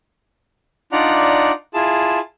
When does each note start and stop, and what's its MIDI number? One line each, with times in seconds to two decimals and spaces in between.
0.92 1.51 62
0.92 1.51 63
0.92 1.51 65
0.92 1.51 74
0.92 1.51 78
0.92 1.51 82
1.74 2.19 64
1.74 2.19 65
1.74 2.19 68
1.74 2.19 81